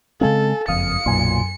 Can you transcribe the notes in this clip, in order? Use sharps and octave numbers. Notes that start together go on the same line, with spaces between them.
C#3 G#3 C4 A4 F5 G#5
F#1 F2 F5 D#6 F6 C#7
B1 F#2 A#2 G#5 C6